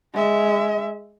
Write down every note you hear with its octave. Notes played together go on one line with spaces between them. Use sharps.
G#3 E5